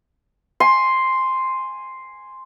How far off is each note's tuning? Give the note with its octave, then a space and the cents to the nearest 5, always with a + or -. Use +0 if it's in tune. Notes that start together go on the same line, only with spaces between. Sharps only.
G#5 +0 C6 +0